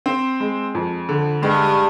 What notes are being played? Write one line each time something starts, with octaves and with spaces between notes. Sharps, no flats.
C4
G#3
F2
D3
G2 G#3